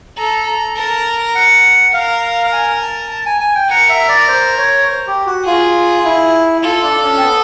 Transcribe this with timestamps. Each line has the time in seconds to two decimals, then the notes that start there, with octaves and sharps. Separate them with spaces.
0.18 A4 A#5
0.47 A#5
0.76 A#4 A5
1.35 F#5
1.93 A#4 F5
2.52 G#5
2.82 A5
3.11 A5
3.26 G#5
3.41 G#5
3.55 G5
3.69 A#4 F#5
3.89 E5
4.09 D5
4.28 C5
4.58 C#5
4.87 C5
5.07 G4
5.26 F#4
5.45 F4 G#4
6.04 E4
6.63 F4 A4
6.83 D4
6.93 D4
7.03 C#4
7.17 C4
7.22 B3